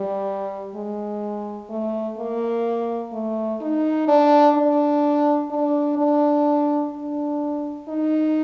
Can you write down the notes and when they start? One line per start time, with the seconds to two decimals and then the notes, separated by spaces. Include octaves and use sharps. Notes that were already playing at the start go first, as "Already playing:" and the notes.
Already playing: G3
0.75 G#3
1.70 A3
2.18 A#3
3.12 A3
3.61 D#4
4.08 D4
4.55 D4
5.51 D4
5.98 D4
6.94 D4
7.88 D#4